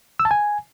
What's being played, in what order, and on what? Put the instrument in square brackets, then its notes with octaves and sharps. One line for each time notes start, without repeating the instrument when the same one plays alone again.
[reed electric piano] E6
A5
G#5